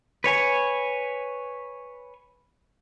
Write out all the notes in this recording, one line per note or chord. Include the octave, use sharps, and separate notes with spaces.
B4 C#5 G#5